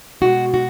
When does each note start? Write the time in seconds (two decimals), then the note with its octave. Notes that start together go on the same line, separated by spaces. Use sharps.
0.21 B2 G#3 F#4
0.54 F#4